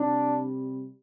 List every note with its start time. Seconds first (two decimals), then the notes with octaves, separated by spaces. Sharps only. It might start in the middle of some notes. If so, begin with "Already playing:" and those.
Already playing: C3 G3 D4